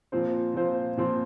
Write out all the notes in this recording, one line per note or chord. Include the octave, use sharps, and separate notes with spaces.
A#2 F3 C4 F4 C5
A#2 F3 C4 F4 C5
A#2 F3 C4 F4 C5